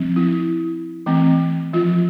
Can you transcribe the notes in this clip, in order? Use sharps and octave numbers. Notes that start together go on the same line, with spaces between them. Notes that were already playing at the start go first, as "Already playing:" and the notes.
Already playing: F3 C4
E4
E3 A3 C4
F3 F4